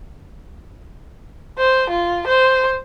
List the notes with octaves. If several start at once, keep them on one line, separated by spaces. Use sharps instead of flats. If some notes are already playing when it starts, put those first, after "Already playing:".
C5
F4
C5